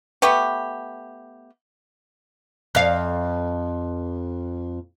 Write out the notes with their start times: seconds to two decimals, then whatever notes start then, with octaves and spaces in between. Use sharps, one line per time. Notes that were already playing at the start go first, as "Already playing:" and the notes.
0.22 A3 B3 G4
2.75 F2 F5